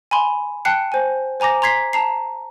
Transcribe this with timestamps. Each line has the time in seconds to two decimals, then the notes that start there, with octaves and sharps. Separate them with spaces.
0.11 G#5 B5 C6
0.65 G5 A5 F#6 C7 C#7
0.92 C5 G#5
1.40 C5 G#5 A#5 D6 A#6
1.62 A#5 C6 G#6 B6 C7
1.93 A5 A#5 C7